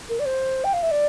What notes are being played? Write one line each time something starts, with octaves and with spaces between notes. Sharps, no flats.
A#4
D5
C5
G5
F5
E5
D5